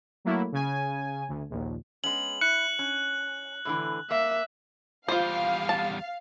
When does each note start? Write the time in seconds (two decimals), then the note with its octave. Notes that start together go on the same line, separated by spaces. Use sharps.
0.25 F#3 A3 A#3 E4
0.52 C#3 G#5
1.28 D2
1.50 A#1 D#2
2.04 G#3 B3 C#4 F#7
2.41 E4 F#6 C#7
2.79 C#4
3.65 A2 D3 E3
4.11 A#3 E5
5.08 E2 G3 F4 C5 F5
5.69 A5